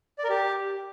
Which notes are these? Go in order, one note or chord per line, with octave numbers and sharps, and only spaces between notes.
D5
A#4
G4